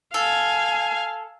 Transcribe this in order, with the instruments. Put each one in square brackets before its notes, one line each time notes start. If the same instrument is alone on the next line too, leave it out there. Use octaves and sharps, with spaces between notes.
[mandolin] A4 [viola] F5 G#5